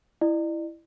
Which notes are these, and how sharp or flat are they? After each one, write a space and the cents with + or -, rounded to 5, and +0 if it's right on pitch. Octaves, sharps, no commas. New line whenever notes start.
E4 +5 D5 +40